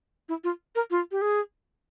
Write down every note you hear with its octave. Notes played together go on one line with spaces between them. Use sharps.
E4
F4
A#4
F4
G4
G#4